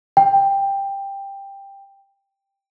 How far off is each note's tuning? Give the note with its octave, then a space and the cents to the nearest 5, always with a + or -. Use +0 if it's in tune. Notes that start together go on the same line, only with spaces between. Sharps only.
G5 +10